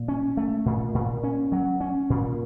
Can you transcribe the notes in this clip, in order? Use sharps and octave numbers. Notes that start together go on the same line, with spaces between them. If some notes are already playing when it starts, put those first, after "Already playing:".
Already playing: A#2
C#4
A3
A#2
A#2
C#4
F#3
C#4
A#2